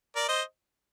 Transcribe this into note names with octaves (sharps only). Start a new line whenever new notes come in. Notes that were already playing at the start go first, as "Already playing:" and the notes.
A#4 D5
C5 D#5